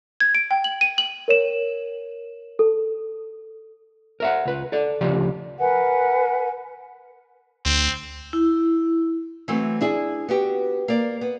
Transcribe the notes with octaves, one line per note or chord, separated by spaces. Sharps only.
G#6
D7
G5
F#7
D#7
F#7
A#4 C#5 E7
A4
A#4 E5 F#5
C#2 B4
A4 D5
D2 C#3 F3 G4 D5
A#4 B4 F#5 G#5
D2 C4
E4
E3 F#3 A3 C4
D4 E4 G#4
B3 F#4 G4
A#3 D5
B3